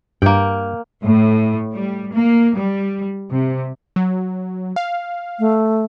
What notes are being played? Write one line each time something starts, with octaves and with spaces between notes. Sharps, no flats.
G2 A#3 G5
A2
G3
A#3
G3
C3
F#3
F5
A3